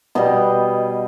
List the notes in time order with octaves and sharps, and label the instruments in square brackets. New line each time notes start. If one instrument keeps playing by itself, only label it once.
[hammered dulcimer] B2 G3 D#5